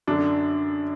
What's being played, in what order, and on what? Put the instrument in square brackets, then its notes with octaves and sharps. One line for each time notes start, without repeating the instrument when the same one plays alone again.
[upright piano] F#2 D3 D4